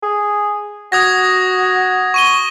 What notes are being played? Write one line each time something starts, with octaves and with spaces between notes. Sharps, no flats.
G#4
F#4 D#6 G#6 A#6
C#6 D#7 G7